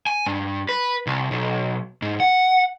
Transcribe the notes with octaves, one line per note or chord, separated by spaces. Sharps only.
G#5
G2
B4
C2
B1
G#2
F#5